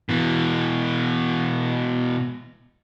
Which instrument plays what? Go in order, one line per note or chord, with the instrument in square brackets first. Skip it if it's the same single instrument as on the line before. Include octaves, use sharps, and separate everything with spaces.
[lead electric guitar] B2 E3